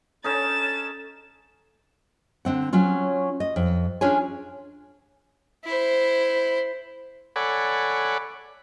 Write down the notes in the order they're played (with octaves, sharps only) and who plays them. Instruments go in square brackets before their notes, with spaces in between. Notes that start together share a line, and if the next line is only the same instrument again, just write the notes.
[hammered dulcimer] C#4 D#4 [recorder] A4 [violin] A6 E7
[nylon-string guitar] D3 C4 F#5
F#3 C#4 F4
D#5
F2
C#4 D4 F4 G#4 C#5 G#5
[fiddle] E4 C5
[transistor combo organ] A4 C#5 D5 F#5 G#5 B5